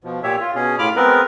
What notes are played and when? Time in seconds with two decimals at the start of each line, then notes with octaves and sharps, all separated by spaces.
0.04 B2 F3
0.23 A#2 G4 C#5 E5
0.41 F4
0.55 B2 C#4 G#4
0.79 A2 F4 B5 D6 F6
0.96 G#3 B3 C4 A#4 B4